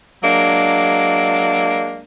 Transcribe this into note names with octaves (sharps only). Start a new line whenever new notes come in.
F#3 G#3 A#3 D4